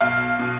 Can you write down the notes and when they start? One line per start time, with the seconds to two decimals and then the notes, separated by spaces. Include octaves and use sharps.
0.01 B1 F5
0.39 B2